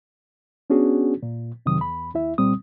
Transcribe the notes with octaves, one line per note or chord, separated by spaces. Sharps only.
B3 C#4 D4 F#4 G#4
A#2
F2 C3 D#3 F#3 D#6
E2 B5
D#2 E4 E5
C2 A#2 G3 C4 D#6